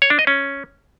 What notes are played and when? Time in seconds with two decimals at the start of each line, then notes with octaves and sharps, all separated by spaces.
0.02 C#5
0.10 D4
0.19 D#5
0.27 C#4